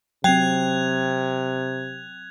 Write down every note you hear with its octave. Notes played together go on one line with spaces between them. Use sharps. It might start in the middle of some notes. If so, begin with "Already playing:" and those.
C3 F#3 C4 G5 F#6 G#6 F7